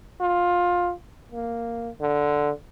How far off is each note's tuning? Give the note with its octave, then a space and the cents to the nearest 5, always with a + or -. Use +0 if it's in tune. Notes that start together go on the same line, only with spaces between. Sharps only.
F4 +15
A#3 -5
D3 +0